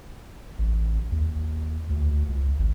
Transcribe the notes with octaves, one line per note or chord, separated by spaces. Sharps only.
A1
D#2
D2
C#2
G#1